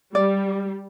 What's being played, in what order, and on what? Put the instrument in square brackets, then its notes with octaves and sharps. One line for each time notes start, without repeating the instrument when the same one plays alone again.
[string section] G3 [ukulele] D5